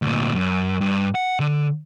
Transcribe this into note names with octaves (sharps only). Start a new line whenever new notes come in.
D2 A#2
F#2
G2
F#5
D3